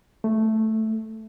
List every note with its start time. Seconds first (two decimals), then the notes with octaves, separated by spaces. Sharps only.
0.24 A3